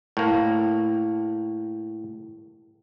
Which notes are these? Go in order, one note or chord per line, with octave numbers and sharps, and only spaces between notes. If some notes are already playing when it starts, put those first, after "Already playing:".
A2 A#3